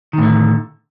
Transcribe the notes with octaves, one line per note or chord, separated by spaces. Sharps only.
A2 D3 D#3